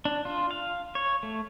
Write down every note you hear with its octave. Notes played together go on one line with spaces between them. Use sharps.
D4
F4
F5
C#5
A3